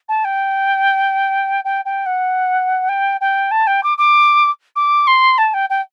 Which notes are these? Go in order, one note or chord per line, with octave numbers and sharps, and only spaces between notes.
A5
G5
G5
G5
F#5
G5
G5
A5
G5
D6
D6
D6
C6
A5
G5
G5